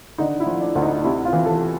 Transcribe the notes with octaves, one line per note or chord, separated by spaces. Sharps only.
D3 D#4
E4
F3
D4
D2
D#4
C3 E4
F4
E3
A4